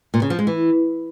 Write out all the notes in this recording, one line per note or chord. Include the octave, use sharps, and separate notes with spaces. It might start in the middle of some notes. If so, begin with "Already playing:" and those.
A#2
C#3
F3
G#3
E3